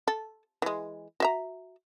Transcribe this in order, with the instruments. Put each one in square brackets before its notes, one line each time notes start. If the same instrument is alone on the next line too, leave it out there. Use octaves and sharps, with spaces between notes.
[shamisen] A4
E3 G#3
F#4 E5 A#5